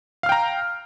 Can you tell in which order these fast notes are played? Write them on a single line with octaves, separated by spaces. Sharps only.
F5 F6 G5 A#5